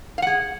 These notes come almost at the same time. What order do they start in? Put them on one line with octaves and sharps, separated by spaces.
F5 F#5 G#4